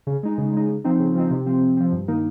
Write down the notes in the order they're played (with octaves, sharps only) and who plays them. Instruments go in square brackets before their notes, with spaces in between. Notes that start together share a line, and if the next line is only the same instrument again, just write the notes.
[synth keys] C#3
G#3 D#4
C#3
G#3 D#4
C#3
F3 C4 D#4
C#3
F3 C4 D#4
C3
F3 C4
C3
F3 C4
G2
D#3 A#3 D#4